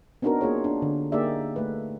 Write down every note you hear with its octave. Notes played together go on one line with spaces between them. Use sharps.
B3 C4 D4 D#4 F#4 A#4
A#3 F4 G#4 C#5
D4
D3
A#3 D#4 G4 G#4 D5 E5
A3 B4